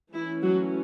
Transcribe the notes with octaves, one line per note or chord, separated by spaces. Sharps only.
E3 A3 C#4 E4
F#3 F#4